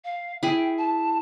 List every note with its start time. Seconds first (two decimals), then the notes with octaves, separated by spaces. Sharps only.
0.04 F5
0.43 E4 G#4 G5
0.78 A5